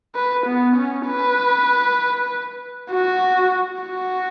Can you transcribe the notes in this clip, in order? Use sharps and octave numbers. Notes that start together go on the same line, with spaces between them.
B4
B3
C#4
B4
F#4
F#4